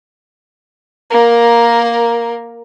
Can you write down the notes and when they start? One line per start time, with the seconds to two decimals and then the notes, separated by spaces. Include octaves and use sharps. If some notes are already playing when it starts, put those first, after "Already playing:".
1.10 A#3 A#4